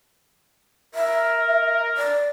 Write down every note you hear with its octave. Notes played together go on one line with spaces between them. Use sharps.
A#4 E5
D5